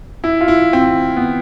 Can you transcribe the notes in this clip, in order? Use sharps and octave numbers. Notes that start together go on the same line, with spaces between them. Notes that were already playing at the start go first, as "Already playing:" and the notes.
E4
F4
E4
C4
B3